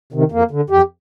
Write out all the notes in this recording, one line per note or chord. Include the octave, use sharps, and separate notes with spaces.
C3 D#3
F2 A#3
D3
F2 G4